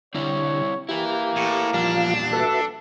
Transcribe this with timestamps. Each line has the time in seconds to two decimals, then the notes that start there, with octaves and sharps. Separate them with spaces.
0.14 D3 G3 C4 E4 C#5
0.89 A#3 E4 G4 B4
1.36 A2
1.74 E2 A#2 F3 G3 D4 F4 F5
2.33 F#4 A4 B4 E5